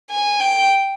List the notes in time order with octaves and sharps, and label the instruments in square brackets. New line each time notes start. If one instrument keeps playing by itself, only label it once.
[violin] G#5
G5